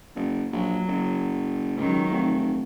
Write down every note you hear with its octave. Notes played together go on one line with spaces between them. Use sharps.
F#1
A#1 F#3
F#1
C#2 D#3 F#3
F1